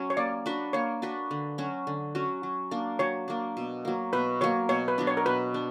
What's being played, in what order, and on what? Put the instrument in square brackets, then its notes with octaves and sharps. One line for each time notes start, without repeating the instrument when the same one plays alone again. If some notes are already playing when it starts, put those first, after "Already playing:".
Already playing: [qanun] F#3 C#4
[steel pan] C#5
[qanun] A#3 [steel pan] D5
[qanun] D4 F#4 B4
[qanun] A#3 [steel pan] C#5
[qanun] D4 F#4 B4
D3
F#3 C#4 F#4
D3
F#3 C#4 F#4
F#3
A#3 D4
[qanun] F#3 [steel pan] C#5
[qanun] A#3 D4
B2
F#3 A#3
[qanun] B2 [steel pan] B4
[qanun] F#3 A#3 [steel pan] C#5
[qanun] B2 [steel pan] C#5
[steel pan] B4
[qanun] F#3 B3 D4
[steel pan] C#5
A#4
[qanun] B2 [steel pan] B4
[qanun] D4